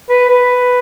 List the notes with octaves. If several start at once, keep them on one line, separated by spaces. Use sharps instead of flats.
B4
B4